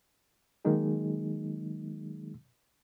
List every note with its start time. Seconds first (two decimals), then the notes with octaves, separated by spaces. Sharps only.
0.65 D#3 F#3 G#3 A#3 D#4 G#4